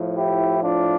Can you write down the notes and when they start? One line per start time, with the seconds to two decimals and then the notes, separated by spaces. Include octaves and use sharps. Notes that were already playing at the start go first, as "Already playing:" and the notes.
Already playing: A2 F3
0.15 E4 G4
0.63 D4 F4